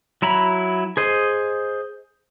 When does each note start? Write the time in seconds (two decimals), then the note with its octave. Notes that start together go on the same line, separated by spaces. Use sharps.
0.22 F#3 E4 A#5 B5
0.97 G#4 C5 D#5